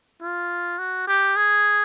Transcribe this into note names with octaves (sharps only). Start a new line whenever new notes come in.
F4
F#4
G4
G#4